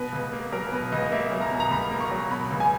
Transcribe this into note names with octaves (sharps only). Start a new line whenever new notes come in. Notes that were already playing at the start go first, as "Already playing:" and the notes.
Already playing: B2 B4
C#2
A#3
F#3 A#4
B2 B4
C#2 D#5
A#3 E5
F#3
A#5
B2
A#5
C#2 B5
A#3
C#6
F#3
B2 B5
C#2
G#5